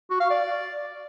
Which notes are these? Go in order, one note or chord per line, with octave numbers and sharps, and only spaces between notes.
F#4
F5
D5